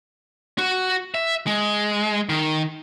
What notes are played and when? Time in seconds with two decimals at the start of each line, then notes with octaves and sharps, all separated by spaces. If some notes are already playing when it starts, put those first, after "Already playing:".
0.58 F#4
1.14 E5
1.47 G#3
2.29 D#3